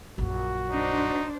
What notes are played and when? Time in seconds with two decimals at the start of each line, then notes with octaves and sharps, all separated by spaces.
0.18 A#1 F#2 F#4
0.71 D4 D#4 C5